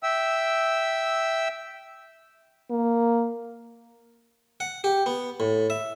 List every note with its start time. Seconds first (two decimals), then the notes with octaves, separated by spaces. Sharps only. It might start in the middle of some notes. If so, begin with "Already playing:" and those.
0.03 E5 G5 E6
2.71 A#3
4.60 F#5
4.84 G4
5.06 B3
5.40 A2
5.70 E5